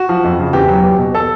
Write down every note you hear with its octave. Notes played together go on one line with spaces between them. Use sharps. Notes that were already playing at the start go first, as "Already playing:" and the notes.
Already playing: F#4
F3
F2
C#3
E2 G4
F#3
E2
B2
A4